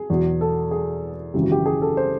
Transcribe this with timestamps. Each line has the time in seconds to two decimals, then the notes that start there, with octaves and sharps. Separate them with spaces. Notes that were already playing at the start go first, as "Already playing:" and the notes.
Already playing: G#4
0.10 E2 B2 F#3
0.41 A4
0.71 G#4
1.34 G#1 F#2 C#3 E3 G4
1.43 F#4
1.52 G4
1.66 G#4
1.82 A4
1.97 C5